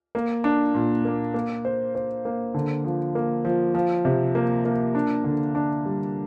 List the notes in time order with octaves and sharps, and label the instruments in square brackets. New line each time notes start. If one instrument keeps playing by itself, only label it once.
[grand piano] A#3
D4
A#2
A#3
A#3
C5
C5
A#3
D3
F3
A#3
F3
F3
C3
A#3
A#3
D4
D3
D4
G3